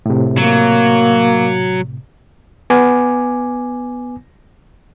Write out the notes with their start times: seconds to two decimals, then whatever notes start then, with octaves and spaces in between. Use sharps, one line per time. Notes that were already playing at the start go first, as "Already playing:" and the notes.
0.06 A2 C3
0.38 F#3 A#3
2.70 B3 G#5 D6